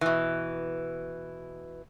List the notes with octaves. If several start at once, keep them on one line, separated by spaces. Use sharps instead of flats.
B2 E3